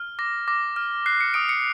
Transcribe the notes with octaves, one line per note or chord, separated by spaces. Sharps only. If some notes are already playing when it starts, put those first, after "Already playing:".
Already playing: F6
D6 A#6
D6 A#6
F6
F#6 C7
C#7
D#6 D7
C#7